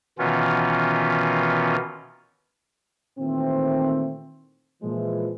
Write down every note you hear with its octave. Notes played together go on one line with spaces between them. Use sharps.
B2 D#3 E3 B3 C#4 F4
A#2 D#3 E3 A3 C4
A#2 E3 F3 G#3